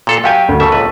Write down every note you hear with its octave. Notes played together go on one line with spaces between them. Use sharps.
A#2 A4 F5
F#3 G4 F5 G5 G#5
D2
C#3 G3 A4 E5 C#6
C#2 A#2 B4